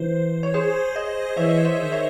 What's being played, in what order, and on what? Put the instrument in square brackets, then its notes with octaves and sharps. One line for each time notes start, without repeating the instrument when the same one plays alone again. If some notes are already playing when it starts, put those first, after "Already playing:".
Already playing: [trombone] E3 [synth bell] C5
[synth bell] C#5
G#4 C5
C5 D#5
[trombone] E3 [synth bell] C#5 E5
[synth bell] C5 D#5
[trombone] D#3
[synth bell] C#5 E5